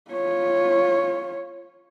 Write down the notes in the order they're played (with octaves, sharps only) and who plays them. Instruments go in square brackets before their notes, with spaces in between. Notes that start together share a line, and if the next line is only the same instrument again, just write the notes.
[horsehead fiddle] F4 C#5